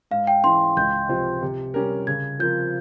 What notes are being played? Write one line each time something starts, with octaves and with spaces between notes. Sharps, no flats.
G#2 F5
G5
E3 G#3 C#4 E4 C6
C#2 G6
C3 F3 C4 F4
C3
G3 C#4 G4 A#4
C#3 G#6
F3 C4 F4 A#4 G6